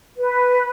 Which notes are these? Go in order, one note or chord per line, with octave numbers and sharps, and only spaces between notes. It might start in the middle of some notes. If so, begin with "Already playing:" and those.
B4